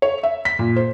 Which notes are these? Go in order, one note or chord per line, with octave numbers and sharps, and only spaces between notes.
C#5
E5
B6
A#2
C5